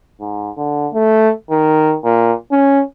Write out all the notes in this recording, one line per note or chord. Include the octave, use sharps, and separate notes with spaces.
G#2
D3
A3
D#3
A#2
C#4